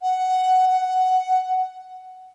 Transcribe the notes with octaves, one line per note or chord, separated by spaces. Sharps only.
F#5
F#5